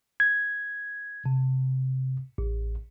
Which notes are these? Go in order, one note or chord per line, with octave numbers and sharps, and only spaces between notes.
G#6
C3
A1